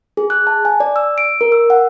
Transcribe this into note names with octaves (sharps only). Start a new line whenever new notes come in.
G#4
F#6
A5
G#5
D5
E6
D7
A#4
E6
F#5